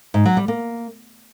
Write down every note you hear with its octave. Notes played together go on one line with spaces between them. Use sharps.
G#2
F#3
G3
A#3